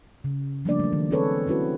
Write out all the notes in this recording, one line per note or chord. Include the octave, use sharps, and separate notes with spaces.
C#3
F3 G3 A3 A#3 D4 D5
F#3 A3
D#3
C4 C#4 G#4 A4 B4 C#5
C4 C#4 E4 F#4 B4